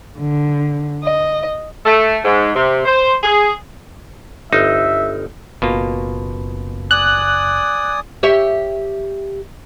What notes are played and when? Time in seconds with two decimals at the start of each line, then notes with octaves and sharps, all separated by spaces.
0.18 D3
1.03 D#5
1.85 A3
2.25 G#2
2.55 C3
2.86 C5
3.24 G#4
4.52 G1 D#4 C5 E5
5.62 F#1 B2 A#3 F4
6.91 D5 G#5 D#6 F#6
8.23 G4 C#5 E5